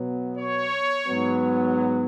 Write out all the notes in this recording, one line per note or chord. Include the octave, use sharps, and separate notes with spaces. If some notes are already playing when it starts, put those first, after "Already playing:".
Already playing: B2 F#3 B3
C#5
G#2 F#3 B3